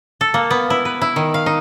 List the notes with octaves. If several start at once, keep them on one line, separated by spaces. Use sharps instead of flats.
A4
A#3
B3
E4
B4
E4
D#3
F5
D#4